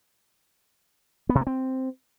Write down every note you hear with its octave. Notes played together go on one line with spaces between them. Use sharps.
B3
C3
A#3
C4